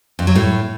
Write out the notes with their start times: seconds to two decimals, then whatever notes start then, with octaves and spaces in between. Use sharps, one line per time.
0.19 F2
0.27 F#3
0.36 A2